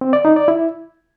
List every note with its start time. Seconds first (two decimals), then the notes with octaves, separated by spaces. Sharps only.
0.01 C4
0.13 D5
0.25 D#4
0.36 D5
0.48 E4